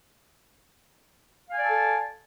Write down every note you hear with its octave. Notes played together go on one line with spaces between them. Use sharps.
A4 D5 F5 G#5 A5